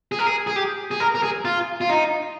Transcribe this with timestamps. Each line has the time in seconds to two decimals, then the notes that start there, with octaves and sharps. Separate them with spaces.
0.12 G#4
0.19 A#4
0.27 G#4
0.47 G#4
0.56 G4
0.91 G#4
1.00 A#4
1.15 A#4
1.23 G#4
1.45 F4
1.81 F4
1.90 D#4